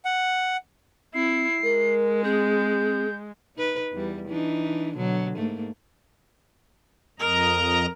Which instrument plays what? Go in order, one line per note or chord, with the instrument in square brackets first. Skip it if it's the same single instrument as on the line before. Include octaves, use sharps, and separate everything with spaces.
[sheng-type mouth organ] F#5
[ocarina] C4 [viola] E4 [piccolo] C7
[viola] G#3 [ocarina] A#4
[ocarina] C4 [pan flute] G#4 [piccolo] G6
[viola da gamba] D#4 B4
E2 E3 G3
E3 D4 D#4
B2 D3 F#3
G#2 A3 A#3
[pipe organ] F2 D#5 A#5 [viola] A#4